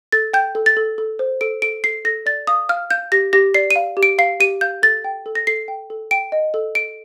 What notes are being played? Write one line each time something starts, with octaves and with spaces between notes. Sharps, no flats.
A4 A6
G5 G6
A4
A6
A4
A4
C5
A4 D7
A4 D7
A4 C7
A4 A#6
D5 A6
F5 D#6
F5 F6
F5 G6
G4 A#6
G4 A#6
D5 C7
D#7
F5
G4
D7
F5 C7
G4 D#7
F5 G6
A4 A6
G5
A4
A#6
A4 C7
G5
A4
G5 D7
D#5
A4
A4 D7